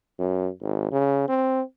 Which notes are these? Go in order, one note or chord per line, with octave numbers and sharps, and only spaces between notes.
F#2
G#1
C#3
C4